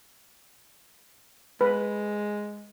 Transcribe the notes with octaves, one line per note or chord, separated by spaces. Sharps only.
G#3 B4